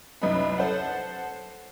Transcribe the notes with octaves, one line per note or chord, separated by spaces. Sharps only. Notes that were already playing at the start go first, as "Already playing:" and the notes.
C2 F#2 D#4 B4 D#5 B5
A4 C5 F#5